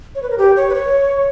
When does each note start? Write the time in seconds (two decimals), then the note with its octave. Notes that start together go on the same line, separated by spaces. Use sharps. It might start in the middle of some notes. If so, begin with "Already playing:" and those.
0.15 C#5
0.22 B4
0.30 A#4
0.38 G4
0.56 C#5
0.70 B4
0.75 C#5